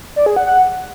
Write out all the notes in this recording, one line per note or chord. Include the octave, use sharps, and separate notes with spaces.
D5
G#4
F#5
F#5